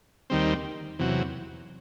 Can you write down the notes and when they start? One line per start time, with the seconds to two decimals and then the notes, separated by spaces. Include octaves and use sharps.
0.30 D#2 D#3 G3 C4
0.99 E2 C3 F#3